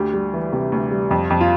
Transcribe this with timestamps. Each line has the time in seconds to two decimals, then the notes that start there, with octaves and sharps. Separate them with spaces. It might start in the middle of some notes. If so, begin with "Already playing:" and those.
Already playing: D2 G4
0.14 G3
0.34 E3
0.53 C3
0.72 D2
0.91 G3
1.11 F2
1.30 F2
1.41 F4